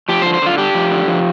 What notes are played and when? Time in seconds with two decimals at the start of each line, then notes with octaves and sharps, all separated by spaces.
0.09 F3 G4
0.22 C5
0.26 D3
0.34 C5
0.42 D3 F4
0.58 D4 G4
0.75 F3
0.91 D3
1.07 F3